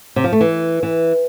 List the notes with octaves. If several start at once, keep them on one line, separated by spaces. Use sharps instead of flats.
C3
F3
A3
E3
E3